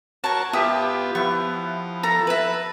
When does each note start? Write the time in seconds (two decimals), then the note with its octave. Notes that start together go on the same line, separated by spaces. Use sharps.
0.24 F#4 A#4 C#5 A5 C#6
0.53 B3 F4 G4 E5 D#6
1.15 F3 B3 E4 C#6
2.03 A4 A#5
2.27 B4 E5